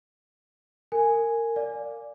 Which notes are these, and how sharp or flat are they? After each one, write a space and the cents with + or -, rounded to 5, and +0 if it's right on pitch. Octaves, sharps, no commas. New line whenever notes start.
A#4 -25 G#5 +0
D5 -5 F5 +0